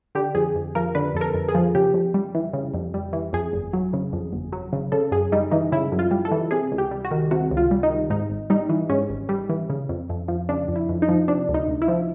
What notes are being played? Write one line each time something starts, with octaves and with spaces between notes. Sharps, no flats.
D3 G4
F2 G#4
F2
F3 A#4
D3 B4
F2 A4
A#4
F2
G#4
F3
C#3 G4
F2
G3
E3
C#3
F2
G3
E3
F2 G#4
G1
F#3
C#3
F2
G1
F#3
C#3
C#3 A4
F#2 G#4
G3 D#4
E3 D#4
C#3 E4
F#2
F4
G3
A4
E3
C3 G#4
C#2
G4
G3
F#4
D#3
C3 F#4
C#2
F4
G3
D#4
D#3
G#2 D#4
G#1
G3 D#4
E3
G#2 C#4
G#1
G3
E3
C#3
F2
F2
F3
C#3 D4
F2
E4
F2
D#4
F3
C3 D4
D2
D#4
D2
E4
F3